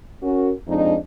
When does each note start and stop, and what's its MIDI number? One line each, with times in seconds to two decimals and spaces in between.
0.23 0.52 61
0.23 0.52 66
0.23 0.52 70
0.68 0.96 41
0.68 0.96 56
0.68 0.96 62
0.68 0.96 63